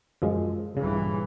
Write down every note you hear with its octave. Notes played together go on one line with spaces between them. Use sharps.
F#2 F3 G#3
A#1 G2 C#3 E3